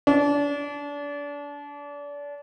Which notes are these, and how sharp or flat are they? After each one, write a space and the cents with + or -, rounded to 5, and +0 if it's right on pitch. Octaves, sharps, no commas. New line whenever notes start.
D4 -30